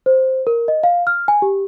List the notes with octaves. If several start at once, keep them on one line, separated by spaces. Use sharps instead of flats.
C5
A#4
D#5
F5
F6
G#5
G4